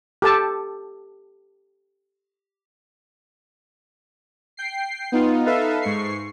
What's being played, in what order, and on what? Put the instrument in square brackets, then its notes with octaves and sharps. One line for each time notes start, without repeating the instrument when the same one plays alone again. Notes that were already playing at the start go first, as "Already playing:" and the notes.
[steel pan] G4 A4 A5
[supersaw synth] G5 C7
B3 D#4 F4
D#4 A4 B4 E5 F5
G#2 C#6 C7